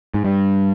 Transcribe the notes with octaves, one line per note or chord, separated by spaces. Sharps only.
G#2
G2